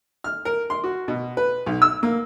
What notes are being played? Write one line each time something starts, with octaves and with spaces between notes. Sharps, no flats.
F6
A#4
C6
F#4
B2
B4
B1
E6
A#3